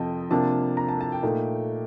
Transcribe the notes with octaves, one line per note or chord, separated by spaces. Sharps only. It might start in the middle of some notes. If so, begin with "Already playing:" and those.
Already playing: F2 C3 F3 D#5 G5 A5
C3 F3 A#3 D4 A5
A#5
A5
A5
G5
A#2 A3 D#4